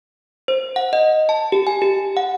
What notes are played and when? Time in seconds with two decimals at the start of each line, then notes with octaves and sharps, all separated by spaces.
0.48 C5
0.76 F#5
0.93 D#5
1.29 A5
1.52 G4
1.67 G#5
1.82 G4
2.17 F#5